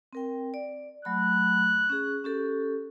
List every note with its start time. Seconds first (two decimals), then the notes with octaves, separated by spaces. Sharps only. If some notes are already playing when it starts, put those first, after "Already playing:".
0.13 C4 A#4 G5
0.54 D5
1.05 F#3 A3 B5 F#6
1.89 C#4 G#4
2.24 C#4 G4 A4